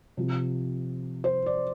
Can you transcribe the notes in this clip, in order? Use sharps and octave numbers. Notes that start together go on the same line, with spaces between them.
C3 F3
C5
D5